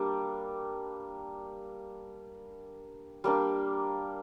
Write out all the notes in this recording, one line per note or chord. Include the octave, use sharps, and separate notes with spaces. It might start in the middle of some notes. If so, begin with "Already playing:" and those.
Already playing: G3 A#3 D4
G3 A#3 D4